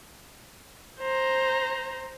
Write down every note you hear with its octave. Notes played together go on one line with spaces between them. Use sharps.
C5 A#5